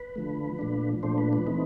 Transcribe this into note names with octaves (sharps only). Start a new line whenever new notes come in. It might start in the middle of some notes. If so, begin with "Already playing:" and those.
Already playing: B4
D3 F3 A3
A#2 F3 A3 D4
A#2 F3 A3 D4 C5
B4
B4
E3 A3 C4 D#4